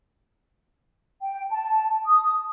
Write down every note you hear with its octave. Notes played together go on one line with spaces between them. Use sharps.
G5
A5
D#6